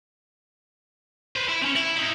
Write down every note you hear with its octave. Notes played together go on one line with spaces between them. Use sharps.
B4 C5
E4
C4 C#4
E4
D#4 E4